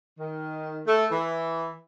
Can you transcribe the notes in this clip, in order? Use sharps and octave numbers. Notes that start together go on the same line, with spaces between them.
D#3
A3
E3